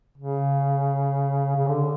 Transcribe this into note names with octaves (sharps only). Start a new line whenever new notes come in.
C#3
C#3
D3